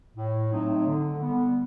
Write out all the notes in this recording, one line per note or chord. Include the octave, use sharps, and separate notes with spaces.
A2
F#3 A3 C4 D#4
D3
G3 B3